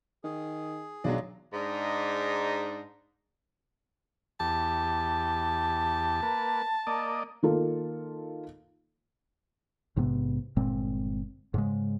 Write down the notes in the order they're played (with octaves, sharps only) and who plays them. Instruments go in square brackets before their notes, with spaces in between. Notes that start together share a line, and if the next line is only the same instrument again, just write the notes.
[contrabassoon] D#3 [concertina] G#4
[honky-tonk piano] B1 [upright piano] F#3 G#3 D4
[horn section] G#2 D4 D#4
[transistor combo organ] E2 G4 [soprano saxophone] A5
[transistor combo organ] A#3 B4
A#3 D5 D#5
[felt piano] D#3 A#3 F4 A4
[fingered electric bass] A#1 G#2 C3 B3
G1 A#2 G#3 C4
G#2 C#3 G#3